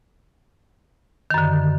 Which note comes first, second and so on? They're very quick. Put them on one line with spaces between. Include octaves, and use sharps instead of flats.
D#3 F#2 D3